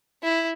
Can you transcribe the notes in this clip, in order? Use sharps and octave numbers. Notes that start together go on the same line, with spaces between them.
E4